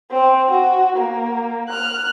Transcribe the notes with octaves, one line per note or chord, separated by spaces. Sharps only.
C4
F#4
A#3
F6 F#6